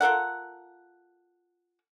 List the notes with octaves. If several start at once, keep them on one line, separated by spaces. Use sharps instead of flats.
F4 A4 A#4 F#5